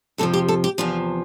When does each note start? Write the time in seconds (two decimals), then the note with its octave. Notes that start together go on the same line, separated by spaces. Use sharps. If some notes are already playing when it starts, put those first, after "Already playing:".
0.18 F2 C3 F3 A4
0.33 G4
0.48 A4
0.64 G4
0.78 E2 C3 F3 F4